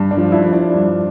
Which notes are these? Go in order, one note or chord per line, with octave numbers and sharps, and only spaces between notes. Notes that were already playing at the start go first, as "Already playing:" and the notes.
Already playing: G2
D4
F3
E4
F3
D4
G2